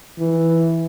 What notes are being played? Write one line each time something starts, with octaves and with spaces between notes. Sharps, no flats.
E3